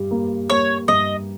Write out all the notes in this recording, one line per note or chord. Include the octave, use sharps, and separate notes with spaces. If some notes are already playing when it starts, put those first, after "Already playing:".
Already playing: G2 G3
A#3
A#3 C#5
G2 D#5